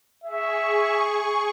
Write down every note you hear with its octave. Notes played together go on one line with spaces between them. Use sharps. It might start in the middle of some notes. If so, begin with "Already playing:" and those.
G#4 E5 C#6